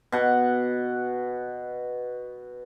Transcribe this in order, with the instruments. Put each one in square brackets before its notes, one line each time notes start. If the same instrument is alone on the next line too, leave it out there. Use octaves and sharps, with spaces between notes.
[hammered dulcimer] B2 F#5